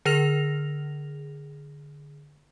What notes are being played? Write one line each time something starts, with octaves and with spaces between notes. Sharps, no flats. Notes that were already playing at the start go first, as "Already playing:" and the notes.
D3 G#4 F6 A#6 F7